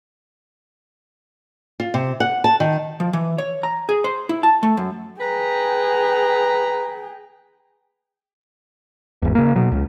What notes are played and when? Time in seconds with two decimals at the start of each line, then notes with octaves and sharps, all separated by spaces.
1.80 F4
1.94 C3
2.20 F#5
2.44 A5
2.60 D#3
3.00 F3
3.13 E3
3.38 C#5
3.63 A#5
3.89 G#4
4.04 C5
4.29 E4
4.43 A5
4.63 A3
4.77 F#2
5.21 G#4 B4 G5 A#5
9.22 G#1 E2
9.35 C#3 A#3
9.56 B2 F#3
9.72 C#2